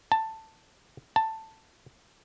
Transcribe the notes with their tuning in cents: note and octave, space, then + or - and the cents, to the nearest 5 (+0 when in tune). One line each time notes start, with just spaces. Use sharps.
A5 +10
A5 +10